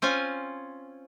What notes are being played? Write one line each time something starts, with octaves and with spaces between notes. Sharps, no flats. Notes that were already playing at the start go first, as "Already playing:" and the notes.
C4 C#4 F4 G#5